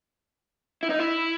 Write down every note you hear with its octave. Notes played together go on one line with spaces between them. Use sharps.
E4
D#4
E4